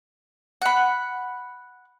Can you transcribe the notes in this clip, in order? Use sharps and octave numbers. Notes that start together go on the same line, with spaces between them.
F#5 B5